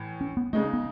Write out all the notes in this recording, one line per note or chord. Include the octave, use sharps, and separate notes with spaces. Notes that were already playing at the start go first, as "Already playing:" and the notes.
Already playing: A2 E3
C#4
B3
C#3 G#3 A3 D#4
B3